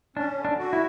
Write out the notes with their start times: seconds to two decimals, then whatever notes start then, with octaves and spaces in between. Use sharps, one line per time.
0.16 C#4 D4
0.38 D3
0.45 D4
0.59 F#4
0.73 E4